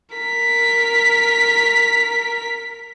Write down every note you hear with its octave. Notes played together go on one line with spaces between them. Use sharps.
A#4 B6